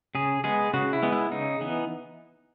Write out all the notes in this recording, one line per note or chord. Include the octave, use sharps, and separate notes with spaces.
C#3 G#4
G#3 B3 G#4
C#3 F#4
E4
G#3 B3
E4
C#3 D#4
E3 B3